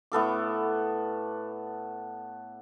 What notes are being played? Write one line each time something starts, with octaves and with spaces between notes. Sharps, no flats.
A2 B3 A4 D6